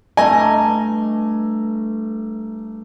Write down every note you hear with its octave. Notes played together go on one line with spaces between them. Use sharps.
G2 A3 D#5 G#5 A#5